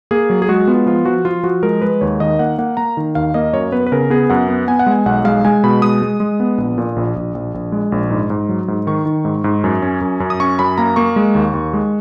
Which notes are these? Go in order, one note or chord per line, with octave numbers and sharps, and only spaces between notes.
A#3 G#4
F#3
G#4
G#3 F#4
B3 F4
F3 F4
F3 F#4
F3 F4
F3 F#4
G#3 A#4
G#3 B4
D#2 C#5
D#3 D#5
A#3 F#5
A#3 F#5
A#3 A#5
D#3
D#2 F5
A#3 D#5
F#2 C#5
B3 B4
B4
C#3 A#4
B3 G#4
F#2 F#5
B3
B3 G#5
F#5
G#3 G#5
B1 F#5
G#3 F5
G#3 G#5
B2 B5
G#3 D#6
G#3
G#3
B3
A#1
A#2
A#1
A#1
A#1
A#1
G#3
A#1
G#2
G#2
F#3
G#2
D#3 C#6
D#3
G#2
G#2
F#2
C#4
F#2
F#2
D#6
C#4 C#6
F#2 B5
A#3 A#5
A#3 C#6
G#3
D#2
D#2
G#3